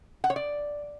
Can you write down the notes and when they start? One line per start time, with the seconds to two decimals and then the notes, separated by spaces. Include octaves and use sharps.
0.24 F#5
0.30 C#5
0.36 D5